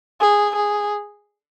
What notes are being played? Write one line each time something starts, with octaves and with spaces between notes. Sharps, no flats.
G#4
G#4